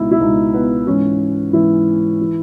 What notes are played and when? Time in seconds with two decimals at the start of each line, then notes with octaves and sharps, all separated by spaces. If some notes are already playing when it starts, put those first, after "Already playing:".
Already playing: C#2 B2 D#4 E4
0.11 E4
0.20 C#2 B2 D#4
0.54 B3
0.87 G#2 E3 C#4
1.53 G#2 E3 E4
2.21 E3